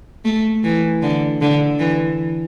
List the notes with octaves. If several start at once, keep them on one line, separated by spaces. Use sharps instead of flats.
A3
E3
D3
D3
E3